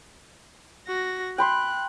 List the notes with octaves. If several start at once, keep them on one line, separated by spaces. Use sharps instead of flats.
F#4 A#6
G5 B5 C6 F#6